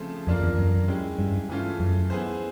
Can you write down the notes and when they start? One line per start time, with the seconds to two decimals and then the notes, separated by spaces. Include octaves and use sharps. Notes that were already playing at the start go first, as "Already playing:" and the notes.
Already playing: C#3 F3 A3 C4
0.27 F2 A#3 D4 F4 A#4
0.42 E2
0.58 F#2
0.88 G#3 C#4 E4 G4
1.19 G2
1.49 C#3 E3 A3 C#4 F4
1.80 F#2
2.10 B3 E4 G#4 C5